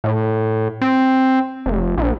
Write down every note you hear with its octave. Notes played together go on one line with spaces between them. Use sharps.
A2
C4
F1
A#1